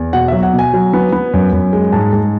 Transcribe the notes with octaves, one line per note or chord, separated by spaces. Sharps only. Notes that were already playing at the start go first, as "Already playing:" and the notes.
Already playing: E2
B2 F#5
F#3 E5
F#5
B2
G#5
F#3
B3
B3
F#2
F#2
G#3
G#2 A5
G#2